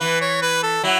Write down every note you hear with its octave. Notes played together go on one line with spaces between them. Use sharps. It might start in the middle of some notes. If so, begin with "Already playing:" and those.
E3 B4
C#5
B4
A4
F#3 E4